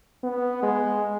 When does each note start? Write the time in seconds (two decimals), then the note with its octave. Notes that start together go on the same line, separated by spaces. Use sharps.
0.24 B3
0.63 G#3